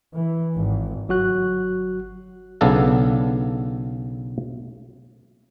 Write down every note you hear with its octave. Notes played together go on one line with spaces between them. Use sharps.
E3
G#1
G1 F#3 F#4 F#6
B1 C#3 B3 D4 A4 F5